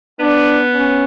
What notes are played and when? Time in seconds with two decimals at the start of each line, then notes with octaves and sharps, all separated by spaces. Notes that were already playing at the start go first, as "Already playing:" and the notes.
0.19 B3 D4
0.74 C#4